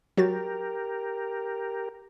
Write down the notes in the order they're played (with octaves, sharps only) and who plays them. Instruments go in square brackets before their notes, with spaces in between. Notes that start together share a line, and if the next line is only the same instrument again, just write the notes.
[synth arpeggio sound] F#3 F#4 A6 [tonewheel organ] G4 A#4